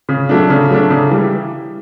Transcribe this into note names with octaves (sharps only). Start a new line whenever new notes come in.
C#3
F#3 A3 D4
C#3
F#3 A3 D4
C#3
E3 G3